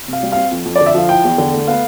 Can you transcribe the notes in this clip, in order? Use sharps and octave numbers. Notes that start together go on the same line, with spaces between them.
C3 F5
G3
C4 F5
F2
F2
D5
D3
E5
F3 F5
E4 G5
E2
D3
A3
B3 F5